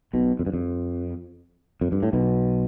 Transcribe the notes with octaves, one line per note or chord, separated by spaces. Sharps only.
B1 B2
F2
G2
F2
F2
G2
A2
B1 B2